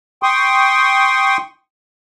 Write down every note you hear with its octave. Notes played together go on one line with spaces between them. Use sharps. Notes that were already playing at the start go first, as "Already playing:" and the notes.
G5 C6 C#6 D#6